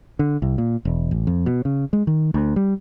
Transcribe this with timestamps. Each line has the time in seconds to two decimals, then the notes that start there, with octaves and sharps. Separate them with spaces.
0.19 D3
0.42 C2
0.58 A#2
0.85 E1
1.11 A1
1.27 F2
1.46 B2
1.65 C#3
1.93 G#3
2.07 D#3
2.34 D2
2.56 G3